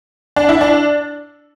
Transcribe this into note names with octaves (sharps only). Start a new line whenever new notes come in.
D4
E4
D4